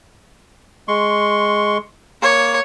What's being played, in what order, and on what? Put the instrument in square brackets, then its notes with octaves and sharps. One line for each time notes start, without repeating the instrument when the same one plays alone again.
[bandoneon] G#3 C6 C#6
[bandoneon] A#3 [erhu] C#5